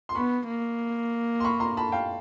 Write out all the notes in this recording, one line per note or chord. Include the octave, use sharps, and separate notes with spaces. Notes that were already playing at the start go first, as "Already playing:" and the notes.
C6
B3 B5 C#6
A#3
C6
B5 C#6
A#5 C6
A5 B5
F5 G5